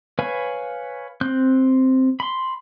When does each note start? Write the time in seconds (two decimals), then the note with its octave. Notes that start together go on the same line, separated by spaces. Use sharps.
0.19 B4 C#5 F5 G#5
1.21 C4 F#6 G6
2.20 B5 C6